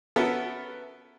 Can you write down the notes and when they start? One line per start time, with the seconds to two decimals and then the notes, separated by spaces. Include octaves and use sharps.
0.16 B3 C#4 F#4 A4 A#4 E5